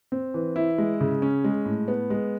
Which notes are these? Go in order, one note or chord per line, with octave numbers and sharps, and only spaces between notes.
C4
E3
E4
G#3
C#3
C#4
G#3
A2
B3
G#3